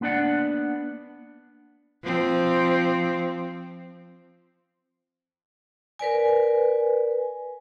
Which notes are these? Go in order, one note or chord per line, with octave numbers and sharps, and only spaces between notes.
A#3 B3 D4 D5 F#5
F3 C4
A#4 B4 D5 G#5